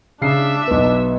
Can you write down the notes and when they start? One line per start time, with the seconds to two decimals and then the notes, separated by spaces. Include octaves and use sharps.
0.21 C#3 D4 E5 C7
0.67 B1 B3